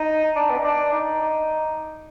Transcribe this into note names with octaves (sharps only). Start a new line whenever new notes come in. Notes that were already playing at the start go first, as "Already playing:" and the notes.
Already playing: D#4
D4
B3
D#4
D4
D#4
D#4